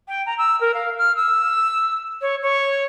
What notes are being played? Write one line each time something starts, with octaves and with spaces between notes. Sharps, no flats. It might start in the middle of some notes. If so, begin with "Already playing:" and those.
G5
A#5
E6
A#4
F5
F6
E6
C#5
C#5